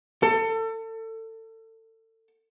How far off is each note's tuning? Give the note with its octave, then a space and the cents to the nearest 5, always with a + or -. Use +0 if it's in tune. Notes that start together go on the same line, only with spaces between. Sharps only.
A4 +30